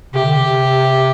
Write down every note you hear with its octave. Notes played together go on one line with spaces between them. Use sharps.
C3 G4
D3
C3